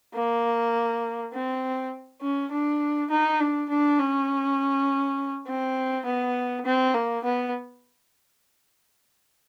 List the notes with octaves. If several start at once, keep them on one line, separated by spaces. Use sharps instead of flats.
A#3
C4
C#4
D4
D#4
D4
D4
C#4
C4
B3
C4
A#3
B3